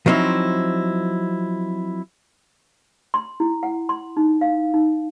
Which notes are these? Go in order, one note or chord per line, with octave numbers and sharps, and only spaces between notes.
F3 F#3 C4 D#4 E4
C6
E4
F#5
C6
D#4
F5
D#4